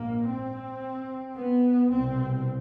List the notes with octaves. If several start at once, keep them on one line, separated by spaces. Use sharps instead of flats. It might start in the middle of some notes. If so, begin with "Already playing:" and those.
Already playing: A#1 G#2 A#3
C4
B3
C2 B2 C4